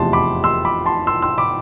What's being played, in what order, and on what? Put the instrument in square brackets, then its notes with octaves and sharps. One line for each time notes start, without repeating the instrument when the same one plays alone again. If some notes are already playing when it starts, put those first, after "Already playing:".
Already playing: [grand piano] F1 E2 C3 F3 A5 C6
B5 D6
C6 E6
B5 D6
A5 C6
C6 E6
C6 E6
B5 D6